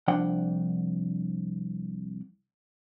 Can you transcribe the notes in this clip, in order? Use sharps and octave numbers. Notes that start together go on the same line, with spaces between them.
C2 F3 D4 F#5 G5